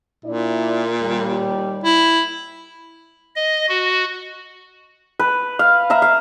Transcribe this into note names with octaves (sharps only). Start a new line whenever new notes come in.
A#2 D4 E4 D5
D#2 G3
E4
D#5
F#4
B4
F5
E5 F5 A#5
F5